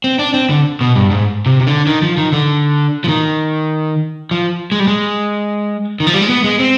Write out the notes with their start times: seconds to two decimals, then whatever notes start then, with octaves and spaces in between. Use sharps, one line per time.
0.04 C4
0.19 D4
0.34 C4
0.50 D3
0.81 B2
0.95 G2
1.11 G#2
1.46 C3
1.61 C3
1.67 D3
1.87 D#3
2.03 F3
2.17 D#3
2.33 D3
3.04 F3
3.08 D#3
4.31 F3
4.72 G#3
4.79 G3
4.88 G#3
6.00 D#3
6.07 F3
6.14 G3
6.21 G#3
6.30 B3
6.44 G#3
6.60 C4